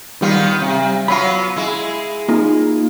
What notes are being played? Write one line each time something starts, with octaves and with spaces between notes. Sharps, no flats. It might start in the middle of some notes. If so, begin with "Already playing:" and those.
D#3 G3 B3 F4
C3
F#3 B3 F4 B5
G#3 E4
A#3 D#4 F4